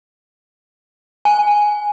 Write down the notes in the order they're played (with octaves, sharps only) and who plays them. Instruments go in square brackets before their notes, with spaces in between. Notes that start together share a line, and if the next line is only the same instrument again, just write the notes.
[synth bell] G#5